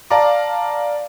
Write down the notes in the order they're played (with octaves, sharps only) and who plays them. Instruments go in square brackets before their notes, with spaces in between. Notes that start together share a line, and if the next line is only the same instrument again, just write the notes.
[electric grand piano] D5 F5 A5 A#5 D6